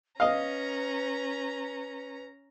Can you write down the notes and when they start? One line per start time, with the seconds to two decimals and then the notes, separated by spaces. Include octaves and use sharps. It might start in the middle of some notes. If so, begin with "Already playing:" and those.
0.20 C#4 B4 D#5 F5 A#5